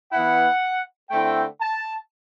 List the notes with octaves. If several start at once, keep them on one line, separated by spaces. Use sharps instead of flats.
E3 B3 E4 F#5
D3 A3 C4 E4 G5
A5